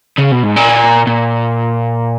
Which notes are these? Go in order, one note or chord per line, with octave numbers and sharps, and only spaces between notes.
C#3
B2
G#2
A#2
A#2